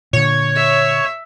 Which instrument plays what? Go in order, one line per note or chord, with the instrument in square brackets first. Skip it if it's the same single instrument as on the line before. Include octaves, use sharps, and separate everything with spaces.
[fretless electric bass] A#2 D3 [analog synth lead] C#5
[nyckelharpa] E5